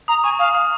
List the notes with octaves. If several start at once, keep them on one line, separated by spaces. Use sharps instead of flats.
A#5 D#6
G#5 C#6
F5 D#6
D#6